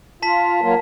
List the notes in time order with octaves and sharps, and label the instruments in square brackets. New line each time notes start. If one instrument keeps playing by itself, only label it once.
[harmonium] F4 [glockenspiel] A5 B6
[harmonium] F#3 A#3 F4